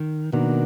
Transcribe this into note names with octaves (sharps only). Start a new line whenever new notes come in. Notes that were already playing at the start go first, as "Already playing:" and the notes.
Already playing: D#3
B2 D#3 A#3 D4 F#4